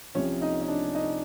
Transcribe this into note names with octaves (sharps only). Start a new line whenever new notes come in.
C2 C3 F3 C#4 C#5
D#4 D#5
D#5
D4 D5
D#4 D#5